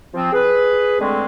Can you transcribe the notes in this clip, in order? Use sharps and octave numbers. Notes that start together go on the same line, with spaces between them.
F3 C4
G#4 B4
D3 G#3 A3 C4